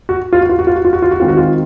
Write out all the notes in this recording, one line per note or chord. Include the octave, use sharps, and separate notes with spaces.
F#4
F4
F#4
F4
F#4
F4
F#4
F4
F#4
F4
F#4
D#3 G#3 C4 D#4 F4
F#4
F4